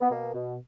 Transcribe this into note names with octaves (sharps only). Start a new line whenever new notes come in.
B3
B2 A#3
B2